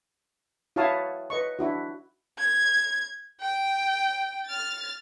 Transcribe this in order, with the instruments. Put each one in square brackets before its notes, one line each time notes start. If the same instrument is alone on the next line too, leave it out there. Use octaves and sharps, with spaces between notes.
[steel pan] E4 F#4 C#5 F5 A5 D#6
B4 D#5 C#6
D4 E4 F#4
[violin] G#6
G5
F6 A6